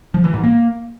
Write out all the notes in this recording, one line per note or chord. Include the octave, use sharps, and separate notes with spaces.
F3
E3
G#2
A#3